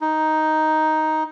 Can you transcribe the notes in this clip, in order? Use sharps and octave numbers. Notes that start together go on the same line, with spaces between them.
D#4